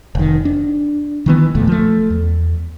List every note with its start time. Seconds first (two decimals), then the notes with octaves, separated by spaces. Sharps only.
0.15 F1 D#3
0.45 D4
1.26 D#3 E3 B3
1.55 E1 D2 A#2 A3
1.67 F3 A3
2.10 E2